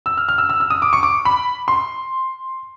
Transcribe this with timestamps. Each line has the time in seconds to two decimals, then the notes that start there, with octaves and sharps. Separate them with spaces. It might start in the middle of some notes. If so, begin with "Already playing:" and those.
0.06 E6
0.17 F6
0.29 F6
0.38 E6
0.49 E6
0.60 E6
0.70 D#6
0.82 D6
0.93 C#6
1.03 D6
1.25 B5
1.68 C6